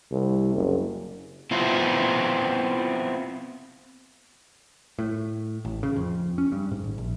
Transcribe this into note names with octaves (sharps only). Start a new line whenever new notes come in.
C2
F#1
B3 C4 E4 F4
A2
A1
C#3
F2
C#4
G2
G#2
G#1
A#1